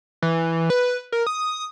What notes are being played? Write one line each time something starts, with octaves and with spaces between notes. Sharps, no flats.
E3
B4
A#4
D#6